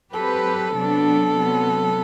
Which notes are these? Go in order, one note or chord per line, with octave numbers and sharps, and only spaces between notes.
F#3 C4 G4 A4 B4
C3 F#3 B3 D4
C3 F#3 B3